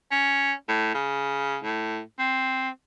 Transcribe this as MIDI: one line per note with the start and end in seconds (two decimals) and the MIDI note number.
0.12 0.52 61
0.69 0.91 45
0.94 1.57 49
1.64 2.00 45
2.19 2.69 60